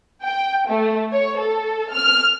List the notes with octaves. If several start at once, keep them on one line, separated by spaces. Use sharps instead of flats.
G5
A3
C#5
A4
F6